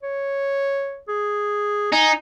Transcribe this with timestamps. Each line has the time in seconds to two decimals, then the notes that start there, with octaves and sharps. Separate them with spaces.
0.03 C#5
1.08 G#4
1.93 D#4 G#5